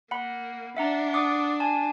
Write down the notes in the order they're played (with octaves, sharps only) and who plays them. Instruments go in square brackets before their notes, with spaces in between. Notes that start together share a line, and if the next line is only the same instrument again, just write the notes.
[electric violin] A#3 [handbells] F#5 B5
[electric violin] D4 [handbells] E5 F#5 A#5
[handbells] F#5 D6 D#6
G#5 A5